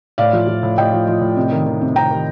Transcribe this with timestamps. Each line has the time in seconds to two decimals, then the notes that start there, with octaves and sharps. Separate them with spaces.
0.18 A2 D5 F5
0.33 F3
0.47 F3
0.63 A2
0.78 A2 D#5 G5
0.93 F3
1.08 F3
1.21 A2
1.36 C3
1.52 D#3
1.66 D#3
1.81 C3
1.95 C3 G5 A#5
2.11 D#3